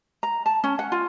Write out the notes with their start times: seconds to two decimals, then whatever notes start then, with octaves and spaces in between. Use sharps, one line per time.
0.23 A#5
0.46 A5
0.64 C#4
0.79 F#5
0.92 F4